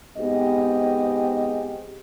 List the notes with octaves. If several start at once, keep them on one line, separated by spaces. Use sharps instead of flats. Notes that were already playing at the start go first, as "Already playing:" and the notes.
G#2 B3 C4 G4 G#4 D#5